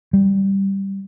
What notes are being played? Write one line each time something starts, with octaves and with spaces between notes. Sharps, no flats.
G3